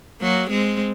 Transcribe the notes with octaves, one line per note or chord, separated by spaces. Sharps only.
F#3 A#3
G#3 C4